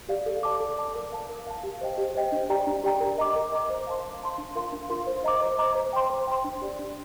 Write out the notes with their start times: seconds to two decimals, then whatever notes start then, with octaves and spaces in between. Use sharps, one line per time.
0.09 G4 D5 F5
0.26 A4
0.43 D5 A5 D6
0.60 A4
0.78 D5 A5 D6
0.95 A#4
1.12 F5 A5
1.29 A#4
1.47 F5 A5
1.63 G4
1.81 C5 D#5 G5
1.98 G4
2.15 C5 D#5 G5
2.32 D4
2.50 G4 D5 G5 A#5
2.67 D4
2.84 G4 D5 G5 A#5
3.00 A#4
3.18 D#5 A#5 D6
3.36 A#4
3.52 D#5 A#5 D6
3.69 C5
3.87 F5 A5 C6
4.04 C5
4.21 F5 A5 C6
4.38 D4
4.55 F4 A#4 F5 C6
4.72 D4
4.89 F4 A#4 F5 C6
5.07 C5
5.24 D#5 A#5 D6
5.41 C5
5.58 D#5 A#5 D6
5.75 C5
5.93 G5 C6
6.10 C5
6.27 G5 C6
6.44 D4
6.62 G4 D5
6.79 D4